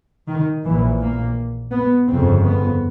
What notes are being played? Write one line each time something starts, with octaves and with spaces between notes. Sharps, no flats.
D#3
A#1 A#2 E3
A#3
B3
G1 F2 C#3 C4
B3